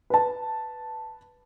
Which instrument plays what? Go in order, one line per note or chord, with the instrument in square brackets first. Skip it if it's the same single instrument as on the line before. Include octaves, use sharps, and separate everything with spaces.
[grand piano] B4 A5